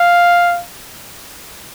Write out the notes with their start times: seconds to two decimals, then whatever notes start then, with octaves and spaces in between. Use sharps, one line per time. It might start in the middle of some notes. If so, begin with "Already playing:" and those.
Already playing: F5